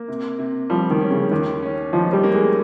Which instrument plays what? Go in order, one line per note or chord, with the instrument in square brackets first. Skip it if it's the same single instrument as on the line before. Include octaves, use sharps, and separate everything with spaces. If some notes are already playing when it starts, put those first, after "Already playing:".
Already playing: [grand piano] A#3
C3
C3
[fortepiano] F3 [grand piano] G3
[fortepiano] D#3
[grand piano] C#4
[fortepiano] C#3
[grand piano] D#2 [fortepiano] D#3
[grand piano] C#4
[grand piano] D#3 [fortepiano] F3
[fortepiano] G3
[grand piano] A#3
[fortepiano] G#3